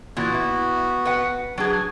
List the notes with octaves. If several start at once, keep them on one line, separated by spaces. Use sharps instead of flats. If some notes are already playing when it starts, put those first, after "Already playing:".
A#2 E3 B3 F#4
E4
B4 F#5
F#3 D4 G#4